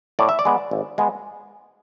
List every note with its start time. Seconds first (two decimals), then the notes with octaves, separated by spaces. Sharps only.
0.19 A2 D5
0.29 E5
0.39 D5
0.45 G#3 B3
0.71 G#1
0.98 G#3 B3